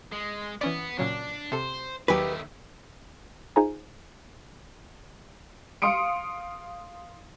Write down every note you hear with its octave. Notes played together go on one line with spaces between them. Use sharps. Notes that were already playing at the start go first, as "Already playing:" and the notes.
G#3
E3 B3 C#4 D5
A#2 C#3 F#3 D4
C3 A4 C5
D#2 D#3 F#3 A3 G4 B4 G#5
D#4 F4 G#4 C5 G#5 A#5
F5 C6 D#6 C#7 D7